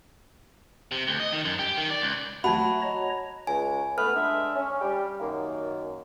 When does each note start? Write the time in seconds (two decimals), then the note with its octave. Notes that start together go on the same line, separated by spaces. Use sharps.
0.92 C3
1.08 D2
1.20 D#5
1.32 D#3
1.45 F#2
1.59 G4
1.77 D#3
1.90 D5
2.02 C#2
2.44 F#3 A3 F#4 F#5 A5 B5 G#6
2.82 C#5 D#5 A#5
3.47 C#2 G#5
3.98 A3 B3 B4 F6
4.16 G#3 D4 E5
4.56 C#4
4.81 G3 G4
5.20 F#2 D#3 A#3